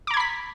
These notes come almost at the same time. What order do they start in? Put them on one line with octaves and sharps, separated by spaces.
D6 A#5 G#6 B5 B6